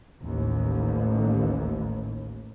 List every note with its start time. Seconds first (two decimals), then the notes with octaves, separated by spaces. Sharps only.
0.21 A1 D#2